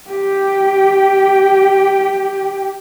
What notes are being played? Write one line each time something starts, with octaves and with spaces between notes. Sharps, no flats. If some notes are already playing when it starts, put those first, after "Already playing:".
G4 G5